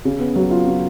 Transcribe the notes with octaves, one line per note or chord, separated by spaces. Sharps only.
C#3
B3
F#3
F4
C#3